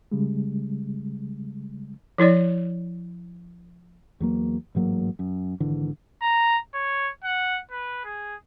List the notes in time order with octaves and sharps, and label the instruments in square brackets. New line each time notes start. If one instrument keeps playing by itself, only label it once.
[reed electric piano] C#3 G3 G#3
[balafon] F3 E4 C#5 D5
[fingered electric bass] E2 F#3 A#3
A1 G#2 F#3 A#3
F#2
G#1 D3 E3
[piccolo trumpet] A#5
C#5
F#5
B4
G#4